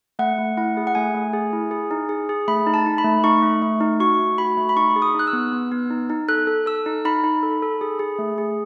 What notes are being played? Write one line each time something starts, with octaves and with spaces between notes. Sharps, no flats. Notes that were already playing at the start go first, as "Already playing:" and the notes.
A3 F#5
A3
E4 F#5
G#4
F#5
A3 G#5
A3
G#4
E4
G#4
D#4
G#4
G#4
A3 B5
D#4
A5
D#4
B5
A3
D#4 C#6
A3
A3
D#4
F#4 C#6
A3
F#4 B5
A3
B5
D#4 C#6
G#4
D#6
D#4 F#6
E6
B3
B3
B3
D#4
D#4
A4 F#6
A4
A4 E6
D#4
D#4 B5
D#4
A4
A4
G#4
G#4
A3
G#4